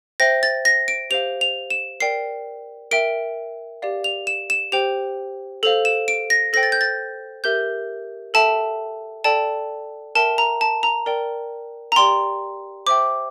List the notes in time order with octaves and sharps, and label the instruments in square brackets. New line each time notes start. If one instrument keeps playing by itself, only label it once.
[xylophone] C5 E5 G5 A#6
A6
A#6
D7
G4 C5 F5 F7
F7
E7
A#4 D5 G5 C7
A#4 E5 G5 D7
G4 D5 F5
F7
E7
E7
G4 C5 G5 F7
A4 C5 F5 F7
E7
D7
A#6
A4 C5 G5 A#6
A6
G6
A6
G4 A#4 E5 G6
A4 E5 G5 A5
A4 D5 G5 A5
A#4 E5 G5 A5
A#5
A5
A#5
A#4 D5 G5
A#5
G4 D5 G5 C6
C5 E5 G5 D6